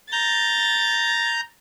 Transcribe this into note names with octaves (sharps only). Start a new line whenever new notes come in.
A#5 G6 A6